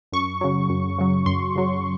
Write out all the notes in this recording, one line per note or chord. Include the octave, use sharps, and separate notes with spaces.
F#2 C#6
C#3 F#3
F#2
C#3 F#3
F#2 C6
C#3 F#3